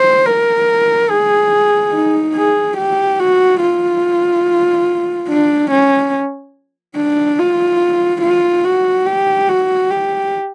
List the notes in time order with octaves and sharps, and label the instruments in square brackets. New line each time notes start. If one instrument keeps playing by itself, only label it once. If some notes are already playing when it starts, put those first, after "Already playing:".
Already playing: [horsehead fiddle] C5
A#4
G#4
D#4
G#4
G4
F#4
F4
D4
C#4
D4
F4
F4
F#4
G4
F#4
G4